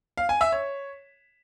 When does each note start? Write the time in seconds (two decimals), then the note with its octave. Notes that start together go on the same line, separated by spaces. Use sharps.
0.17 F5
0.29 G#5
0.41 E5
0.52 C#5